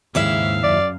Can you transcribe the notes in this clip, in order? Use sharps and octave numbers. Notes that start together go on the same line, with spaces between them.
D#2 G#2 C#3 E4 E5 F5
F#2 D5